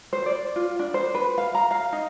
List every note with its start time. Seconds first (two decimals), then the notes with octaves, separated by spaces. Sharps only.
0.13 C5
0.26 D5
0.56 F4
0.79 D4
0.94 C5
1.15 B4
1.38 F5
1.55 A#5
1.71 F5
1.92 D#4